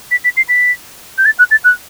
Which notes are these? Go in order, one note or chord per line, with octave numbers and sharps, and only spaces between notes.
B6
B6
C7
B6
G6
A6
F#6
A6
F#6